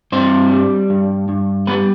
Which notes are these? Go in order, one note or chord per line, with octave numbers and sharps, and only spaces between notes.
G2 C4 C5
G3
G2
G2
G3 B3 B4